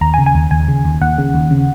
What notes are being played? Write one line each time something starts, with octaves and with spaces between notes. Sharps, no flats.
D#2 A#5
G#5
C#3
G#5
D#2
D#2 G#5
C#3
D#2
D#2 F#5
C#3
D#2
C#3